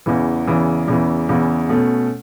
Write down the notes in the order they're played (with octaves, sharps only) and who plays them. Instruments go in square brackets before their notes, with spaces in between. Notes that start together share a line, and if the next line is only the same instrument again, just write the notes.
[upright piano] E2 C#3 E3
E2 C#3 E3
E2 C#3 E3
E2 C#3 E3
B2 A3 C#4